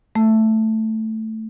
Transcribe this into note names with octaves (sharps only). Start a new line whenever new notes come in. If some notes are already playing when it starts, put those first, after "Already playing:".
A3